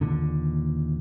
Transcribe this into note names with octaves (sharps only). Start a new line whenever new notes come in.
D#2 A#2 D3